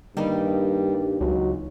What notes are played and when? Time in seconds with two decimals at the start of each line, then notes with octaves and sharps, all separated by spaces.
0.17 G2 D#3 G3 A#3 D#4
1.21 C#2 F#3